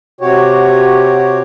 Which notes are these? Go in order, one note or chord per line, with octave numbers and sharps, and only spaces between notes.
C3 F#4 G4 C#5